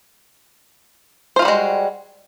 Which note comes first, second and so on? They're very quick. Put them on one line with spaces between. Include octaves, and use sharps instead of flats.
C5 F4 F#4 G3 G#3